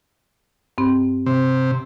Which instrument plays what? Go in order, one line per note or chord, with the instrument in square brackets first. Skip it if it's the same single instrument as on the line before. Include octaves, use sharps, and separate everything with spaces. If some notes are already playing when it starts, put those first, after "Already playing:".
[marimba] G2 C4
[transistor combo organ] C3